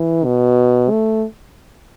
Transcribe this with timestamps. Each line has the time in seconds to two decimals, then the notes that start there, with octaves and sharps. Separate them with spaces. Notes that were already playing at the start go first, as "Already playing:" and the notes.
Already playing: E3
0.25 B2
0.90 A3